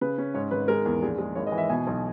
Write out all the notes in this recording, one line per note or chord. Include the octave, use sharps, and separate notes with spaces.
C#3 B4
C#4
G#2 C#5
G#1 B4
G#3 A#4
E2
A#1 G#4
G#3
G#1 C#5
D#5
E3
E5
B2 G#5
B1